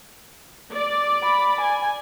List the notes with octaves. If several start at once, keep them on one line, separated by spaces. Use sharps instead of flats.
D5
B5
G#5